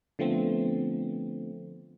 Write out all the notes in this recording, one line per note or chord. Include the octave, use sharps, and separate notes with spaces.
D3 F3 A3 B3 C4